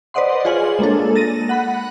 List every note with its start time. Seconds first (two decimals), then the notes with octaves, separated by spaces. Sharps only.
0.14 B4 C5 D5 D#5 F#5 C6
0.45 F4 G#4 C#5 G#5 F#7
0.79 G#3 A#3 D4 A4
1.16 A6 A#6 D#7
1.49 F#5 B5 F#6